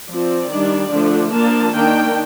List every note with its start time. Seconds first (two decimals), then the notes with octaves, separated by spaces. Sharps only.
0.08 F3 C4 D5
0.50 D#3 G3 D4
0.91 D3 F3 A3 D4
1.32 F3 A#3 D4 A5
1.73 D#3 A#3 D4 G5